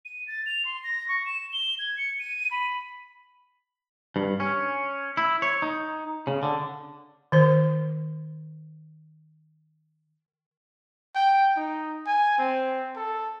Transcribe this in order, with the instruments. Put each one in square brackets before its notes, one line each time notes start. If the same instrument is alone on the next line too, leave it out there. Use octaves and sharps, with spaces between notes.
[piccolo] D#7
A6
F7
C6
A#6
C#6
E7
G7
G#6
C#7
D#7
B5
[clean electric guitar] G2
C#4
E4
C#5
D#4
C#3
D3
[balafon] D#3 C5
[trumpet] G5
D#4
G#5
C4
A4